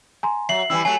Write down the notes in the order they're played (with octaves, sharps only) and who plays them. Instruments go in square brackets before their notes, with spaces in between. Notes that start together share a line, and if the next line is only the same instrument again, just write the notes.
[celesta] G#5 A#5 C6
[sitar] F#3 [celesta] E5 [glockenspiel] C7 F#7
[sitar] E3 G3 E4 [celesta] E6
[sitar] F#3 A3 [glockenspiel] G#5 [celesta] C7